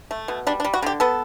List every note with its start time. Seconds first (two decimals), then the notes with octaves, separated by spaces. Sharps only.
0.11 A3
0.28 B2
0.47 G3 D4
0.60 D4
0.64 G3
0.74 F#4
0.82 D3 G4
1.00 B3 A4